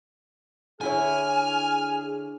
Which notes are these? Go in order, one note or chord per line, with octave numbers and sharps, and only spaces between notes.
D3 E4 G#4 C#5 G#5 F6